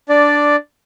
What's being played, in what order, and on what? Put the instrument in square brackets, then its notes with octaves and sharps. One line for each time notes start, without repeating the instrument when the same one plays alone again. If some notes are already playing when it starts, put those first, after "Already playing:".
[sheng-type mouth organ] D4 D5